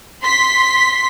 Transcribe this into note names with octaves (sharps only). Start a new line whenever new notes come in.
C6 B6